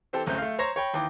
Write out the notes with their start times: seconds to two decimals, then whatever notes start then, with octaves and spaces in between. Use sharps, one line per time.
0.13 E3 C4 G4 A4
0.26 D1 F#2 A3 C4 G6
0.38 A3 F5
0.59 C5 C#5 A#5 A#6
0.76 C#5 G5 B5
0.94 D#2 E3 G5 D6